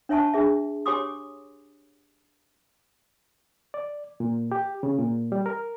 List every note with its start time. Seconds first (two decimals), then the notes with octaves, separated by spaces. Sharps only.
0.09 D4 C#5 E5 G#5 A5 C#6
0.34 D4 G#4 E5
0.86 G4 C#5 G#5 C6 D6 D#6
3.74 D5
4.20 A#2
4.52 G4
4.83 C#3
4.98 A#2
5.32 G3
5.46 A#4